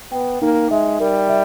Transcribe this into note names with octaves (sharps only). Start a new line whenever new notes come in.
B3 G5
A#3 D#4
G#3 E5
G3 A#4
E5